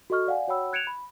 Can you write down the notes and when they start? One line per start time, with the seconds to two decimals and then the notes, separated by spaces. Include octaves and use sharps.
0.10 F#4 A4 D#5 C#6 F6
0.27 D5 F5 F#5 G#5
0.48 F#4 C#5 F#5 G5 B5 E6
0.73 F#6 G#6 C#7 D7 E7 F7
0.87 B5